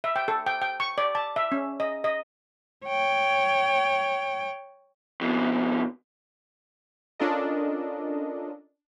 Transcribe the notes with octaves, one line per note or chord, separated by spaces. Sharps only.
E5
G5
A4
G5
G5
C#6
D5
A5
E5
C#4
D#5
D#5
C#5 G5
F2 B2
C#4 D4 F4 A4 A#4 D#5